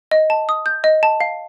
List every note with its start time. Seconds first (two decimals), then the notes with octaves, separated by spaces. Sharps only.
0.11 D#5
0.30 A5
0.49 D#6
0.66 G6
0.84 D#5
1.03 A5
1.21 F5